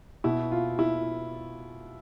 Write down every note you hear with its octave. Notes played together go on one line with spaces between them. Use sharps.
B2 E4
F4
E4